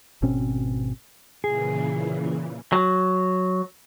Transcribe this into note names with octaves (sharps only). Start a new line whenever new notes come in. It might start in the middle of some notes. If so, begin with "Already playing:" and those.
G#1 B2 C4 C#4
A#2 C#3 E3 G#4
F#3